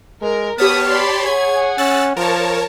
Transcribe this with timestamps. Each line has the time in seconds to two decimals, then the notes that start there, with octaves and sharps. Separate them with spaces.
0.22 G#3 A#4
0.58 B3 G4 C#5 A5 B5 D#6 F6
0.87 D5 B5 C6
1.26 G#4 C#5 F#5 G#6
1.78 C#4 E6 F#6 A6
2.17 F3 A#4 C#5 A5